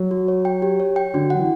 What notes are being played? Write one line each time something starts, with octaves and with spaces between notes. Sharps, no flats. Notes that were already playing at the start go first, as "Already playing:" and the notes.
Already playing: F#3
F#4
C#5
G5
G4
C#5
G5
D3 F#4
F#3 F#5
E3